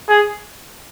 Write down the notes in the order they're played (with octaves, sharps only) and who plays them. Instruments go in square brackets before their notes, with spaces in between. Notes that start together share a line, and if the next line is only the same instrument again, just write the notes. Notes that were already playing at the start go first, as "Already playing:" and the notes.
[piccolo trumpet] G#4